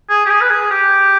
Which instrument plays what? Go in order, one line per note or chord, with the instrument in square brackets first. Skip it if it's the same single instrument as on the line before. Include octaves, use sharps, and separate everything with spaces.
[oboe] G#4
G4
G#4
B4
G#4
G4